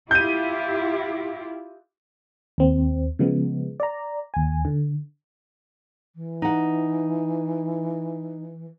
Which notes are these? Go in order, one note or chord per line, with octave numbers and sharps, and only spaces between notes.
E4 F4 G4 G6 D#7
D#2 C4
C#3 F3 G#3 B3
D5 A#5
D#2 G#5
D3
E3
D#4 F#5